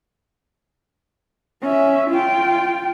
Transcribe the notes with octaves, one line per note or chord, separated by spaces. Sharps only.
C#4 E5
F4 G5